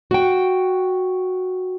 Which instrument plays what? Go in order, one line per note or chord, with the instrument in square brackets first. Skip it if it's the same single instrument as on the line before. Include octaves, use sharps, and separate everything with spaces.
[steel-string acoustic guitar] F#4 G5